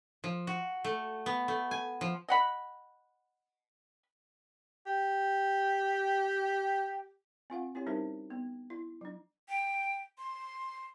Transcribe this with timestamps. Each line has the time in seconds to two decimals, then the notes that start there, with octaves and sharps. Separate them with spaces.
0.24 F3
0.47 F#4
0.84 A3
1.26 B3
1.48 A3
1.71 G#5
2.01 F3
2.28 D#5 F#5 B5
4.86 G4 G5
7.50 C4 F4 F5 F#5
7.75 C4 E4 G4 C#5
7.87 G3 C#4 D#4 G4 A#4 C5
8.30 B3
8.70 E4
9.01 F#3 D4
9.49 G5
10.18 C6